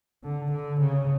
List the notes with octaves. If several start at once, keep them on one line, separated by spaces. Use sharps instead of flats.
D3
D3
C#3